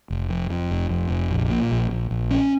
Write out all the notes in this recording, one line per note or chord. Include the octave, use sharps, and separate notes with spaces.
F1
F2
F2
F1
F2
F1
A#1
A#2
A#1
A#1
A#1
C#4